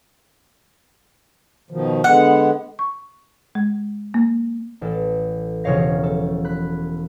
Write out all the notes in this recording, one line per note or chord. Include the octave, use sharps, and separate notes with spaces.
B2 D#3 F3
D3 G#3 B3 F#5
C#6
G#3
A#3
A1 A4
E1 C#3 F3 C#5 F5 A#6
A4
B5 F#6